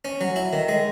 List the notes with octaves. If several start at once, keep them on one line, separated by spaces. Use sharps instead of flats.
C#4
F#3
E4
D#3
G#3